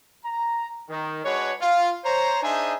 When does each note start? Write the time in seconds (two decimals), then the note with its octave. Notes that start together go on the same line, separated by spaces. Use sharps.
0.24 A#5
0.89 D#3
1.24 G#3 D4 F#4 B4 C#5
1.61 F4
2.05 C5 C#5 A#5
2.43 D4 D#4 G#4 C5 E5 G#5